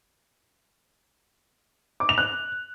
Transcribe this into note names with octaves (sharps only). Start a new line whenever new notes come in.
D6
F7
F#6